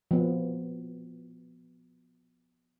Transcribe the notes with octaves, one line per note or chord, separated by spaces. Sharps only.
F3 B3